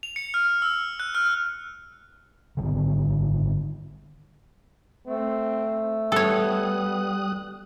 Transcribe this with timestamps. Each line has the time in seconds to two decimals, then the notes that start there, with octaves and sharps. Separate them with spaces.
0.03 F7
0.16 C#7
0.34 F6
0.62 E6
1.00 F#6
1.15 F6
2.57 G#1 D#2 D3 D#3
5.07 A3 C4
6.12 G3 B3 A4 C#5 D#6 F#6